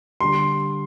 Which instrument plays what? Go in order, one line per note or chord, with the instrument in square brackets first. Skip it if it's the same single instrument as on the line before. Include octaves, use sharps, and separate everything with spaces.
[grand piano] D3 G3 C6